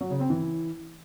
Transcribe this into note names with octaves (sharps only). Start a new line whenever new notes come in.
F#3
C#3
C4
E3